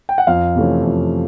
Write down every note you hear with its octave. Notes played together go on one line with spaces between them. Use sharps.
G5
F#5
F2 F5
C3 E3 A3 C#4
F2